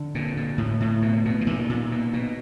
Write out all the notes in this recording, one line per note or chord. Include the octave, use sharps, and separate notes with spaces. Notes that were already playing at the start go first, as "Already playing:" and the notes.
Already playing: D3
A#2
A#2
A2
A2
B2
B2
E3
A#2 D#3
A#2
B2
B2